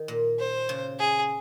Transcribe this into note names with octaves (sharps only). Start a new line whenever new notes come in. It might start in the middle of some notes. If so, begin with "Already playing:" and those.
Already playing: D#3
A#2
C5
C#3
G#4